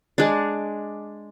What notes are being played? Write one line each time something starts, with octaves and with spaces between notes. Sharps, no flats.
G#3 D4